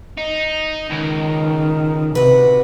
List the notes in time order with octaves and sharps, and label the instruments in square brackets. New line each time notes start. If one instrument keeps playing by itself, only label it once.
[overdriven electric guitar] D#4
[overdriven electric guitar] C#2 [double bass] D#3
[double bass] C3 [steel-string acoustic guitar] F#4 B4